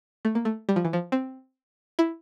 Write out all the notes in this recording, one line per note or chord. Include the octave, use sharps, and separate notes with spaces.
A3
A#3
A3
G3
F3
E3
F3
C4
E4